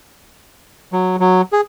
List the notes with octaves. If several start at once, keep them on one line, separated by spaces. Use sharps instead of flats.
F#3
F#3
G#4